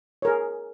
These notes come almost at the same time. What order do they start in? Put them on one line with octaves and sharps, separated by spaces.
C#5 A#4 G#4